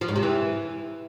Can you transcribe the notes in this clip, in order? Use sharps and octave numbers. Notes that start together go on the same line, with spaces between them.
F3
G#2
C3
E3